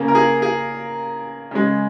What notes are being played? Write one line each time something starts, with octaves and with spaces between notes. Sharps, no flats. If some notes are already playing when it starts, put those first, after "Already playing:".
Already playing: C#3 A#3
A#4
G#4
G#4
C#3 G#3